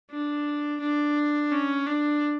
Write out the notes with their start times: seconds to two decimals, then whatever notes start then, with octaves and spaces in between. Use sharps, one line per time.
0.11 D4
0.81 D4
1.53 C#4
1.87 D4